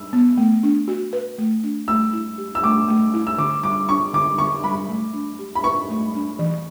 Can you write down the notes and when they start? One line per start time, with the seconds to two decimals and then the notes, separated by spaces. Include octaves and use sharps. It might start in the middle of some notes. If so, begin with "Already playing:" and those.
Already playing: E6
0.13 B3
0.38 A3
0.63 D4
0.88 F#4
1.13 B4
1.38 A3
1.63 D4
1.88 A3 E6
2.13 E4
2.38 G4
2.55 E6
2.63 A3 D6
2.88 A3
3.14 E4
3.27 E6
3.38 D3 D6
3.63 G3 D6
3.89 D4 C#6
4.14 D3 D6
4.38 D3 C#6
4.64 G3 B5
4.89 A3
5.14 D4
5.39 G4
5.55 B5
5.64 B4 C#6
5.89 A3
6.14 D4
6.39 E3